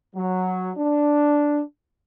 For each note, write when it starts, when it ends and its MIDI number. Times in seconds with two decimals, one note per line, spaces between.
0.15 0.71 54
0.77 1.61 62